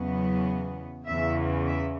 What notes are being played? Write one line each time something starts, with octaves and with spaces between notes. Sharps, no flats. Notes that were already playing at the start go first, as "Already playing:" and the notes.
Already playing: E2 C#3 F#3 B3
E2 C#3 E3 E5
E5